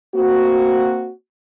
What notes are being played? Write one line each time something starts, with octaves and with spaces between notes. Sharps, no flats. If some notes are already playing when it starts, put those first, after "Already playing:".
A#3 C4 F#4